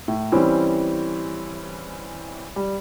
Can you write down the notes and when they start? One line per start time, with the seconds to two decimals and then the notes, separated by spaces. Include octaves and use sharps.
0.08 A2
0.32 E3 G3 C4 C#4
2.56 G3